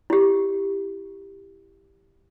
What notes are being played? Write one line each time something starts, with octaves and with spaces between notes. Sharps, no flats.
E4 G4